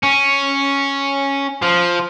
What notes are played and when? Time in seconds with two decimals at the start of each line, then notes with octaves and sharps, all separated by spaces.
0.03 C#4
1.62 F3